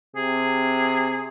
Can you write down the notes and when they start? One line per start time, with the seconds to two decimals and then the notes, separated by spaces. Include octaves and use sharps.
0.16 C3 G#4